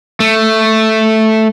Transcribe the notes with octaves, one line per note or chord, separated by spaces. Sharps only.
A3